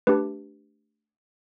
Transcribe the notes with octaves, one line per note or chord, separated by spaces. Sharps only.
A3 D4 G4 B4